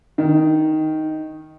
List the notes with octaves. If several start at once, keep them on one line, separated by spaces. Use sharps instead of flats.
D#3